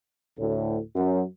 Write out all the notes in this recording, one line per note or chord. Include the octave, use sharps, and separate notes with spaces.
D2 A2
F#2